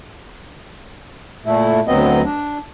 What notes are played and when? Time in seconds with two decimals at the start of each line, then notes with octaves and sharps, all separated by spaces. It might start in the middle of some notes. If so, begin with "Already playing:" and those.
1.46 A#2 A3 E4
1.87 D2 F#3 B3 C4 D#5
2.24 D4